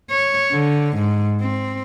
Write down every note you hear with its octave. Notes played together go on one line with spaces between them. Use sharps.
C#5
D3
G#2
C4